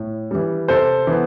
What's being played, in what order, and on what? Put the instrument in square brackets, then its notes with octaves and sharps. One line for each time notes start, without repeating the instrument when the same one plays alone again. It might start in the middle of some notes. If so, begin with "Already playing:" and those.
Already playing: [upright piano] A2
E3 G3
C3 A4 C5
E3 B3